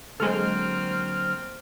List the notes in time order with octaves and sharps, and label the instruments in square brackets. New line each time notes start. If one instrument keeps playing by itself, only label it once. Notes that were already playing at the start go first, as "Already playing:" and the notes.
[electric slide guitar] D3 F#3 C5 [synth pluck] G#3 A4 [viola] A#3 C4 [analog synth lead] F6